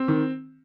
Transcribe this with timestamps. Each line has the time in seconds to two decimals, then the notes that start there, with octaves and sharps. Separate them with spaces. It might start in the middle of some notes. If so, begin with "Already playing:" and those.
Already playing: C4
0.08 D#3